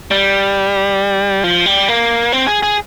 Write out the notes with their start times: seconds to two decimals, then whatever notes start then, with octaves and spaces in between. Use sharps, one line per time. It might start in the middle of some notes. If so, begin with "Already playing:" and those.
0.11 G3
1.44 F3
1.66 G3
1.88 A#3
2.32 C4
2.47 G#4
2.63 G#4